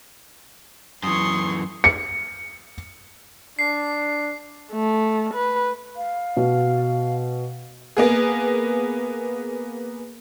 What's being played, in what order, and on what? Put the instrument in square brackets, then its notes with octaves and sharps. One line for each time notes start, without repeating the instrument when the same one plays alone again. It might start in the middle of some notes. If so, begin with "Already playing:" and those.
[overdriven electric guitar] F#2 E3 [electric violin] C6 C#6 [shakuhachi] D#6
[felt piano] C#7
[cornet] D4 [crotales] C7
[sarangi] A3
B4
[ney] F5
[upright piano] B2
[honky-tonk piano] A#3 B3 G#4